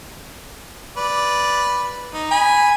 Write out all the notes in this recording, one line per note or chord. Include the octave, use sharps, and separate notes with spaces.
B4 D5
D#4
G#5 B5